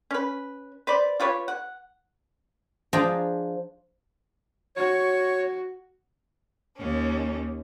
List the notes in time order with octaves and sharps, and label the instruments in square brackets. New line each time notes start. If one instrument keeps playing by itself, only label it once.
[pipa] C#4 B4
B4 C5 D5
F4 G4 B4 C#5
F#5
[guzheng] F3 D4 G#4 C5 G5 A#5
[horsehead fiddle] F#4 [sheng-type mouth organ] C#5
[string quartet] D#2 C#4